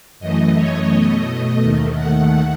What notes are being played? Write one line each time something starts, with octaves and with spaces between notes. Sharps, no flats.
F#2 E3 A3 D#5
C#5
B2 A3 D#5
D#2 D#3 A3
F#5